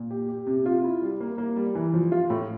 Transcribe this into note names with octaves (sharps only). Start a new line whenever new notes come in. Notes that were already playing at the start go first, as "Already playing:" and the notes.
Already playing: A#2
G4
G4
C3
F4
E4
G3
A#3
A#3
G3
E3
F3
F4
A2